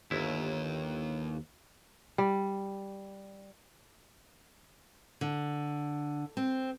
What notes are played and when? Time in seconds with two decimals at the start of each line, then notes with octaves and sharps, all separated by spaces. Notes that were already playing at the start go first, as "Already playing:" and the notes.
0.11 G1 D#2 E4
2.18 G3
5.21 D3
6.37 C4